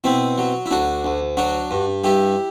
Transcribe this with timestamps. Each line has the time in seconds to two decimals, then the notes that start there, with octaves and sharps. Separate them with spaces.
0.04 B2 C4 E4
0.38 F#3
0.66 E4
0.71 D2 D4 F#4
1.04 D2
1.37 F#3 D4 F#4
1.71 G2
2.04 G2 E4 G4